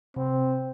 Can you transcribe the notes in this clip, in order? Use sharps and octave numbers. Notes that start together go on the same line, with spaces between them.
C3 C4